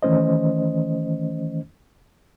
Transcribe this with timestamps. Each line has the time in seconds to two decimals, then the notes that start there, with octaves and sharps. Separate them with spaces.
0.03 D#3 E3 A3 C#4 C5 D#5